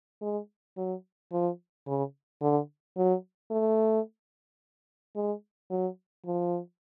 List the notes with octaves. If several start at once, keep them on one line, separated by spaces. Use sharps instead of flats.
G#3
F#3
F3
C#3
D3
F#3
A3
G#3
F#3
F3